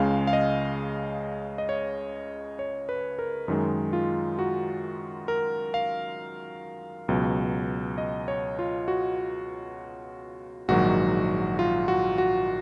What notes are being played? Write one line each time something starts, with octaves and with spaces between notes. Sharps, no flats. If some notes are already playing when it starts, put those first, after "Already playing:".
Already playing: C#2 C#3 G#3 F5
F5
D#5
D#5
C#5
C#5
B4
A#4
F#2 D#3 G#3
F4
F#4
A#4
F5
C#2 B2 F#3
D#5
C#5
F4
F#4
A#1 G#2 D#3 F#3 F#4
F4
F#4
F#4